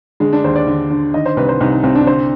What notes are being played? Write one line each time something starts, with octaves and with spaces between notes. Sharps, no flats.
D3 G#3
D4
D#2 C5
D5
D3
D3
D#3 D#5
C5
C2 B4
C5
C2 D#4
D#4
C2 C4
D4
D3 C5